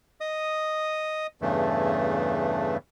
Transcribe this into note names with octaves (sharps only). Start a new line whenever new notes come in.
D#5 D#6
E2 G2 C#3 E3 A3